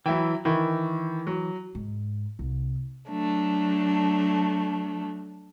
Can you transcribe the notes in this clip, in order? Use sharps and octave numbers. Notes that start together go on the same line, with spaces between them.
E3 F#3 E4 G5
D#3 E3 E4
F#3
G#2
C2
F#3 A3 D4